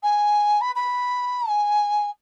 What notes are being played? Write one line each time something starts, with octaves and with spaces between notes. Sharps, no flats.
G#5
B5
B5
G#5